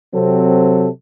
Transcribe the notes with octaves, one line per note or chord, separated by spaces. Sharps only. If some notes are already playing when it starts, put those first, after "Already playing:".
C3 F#3 C4 A4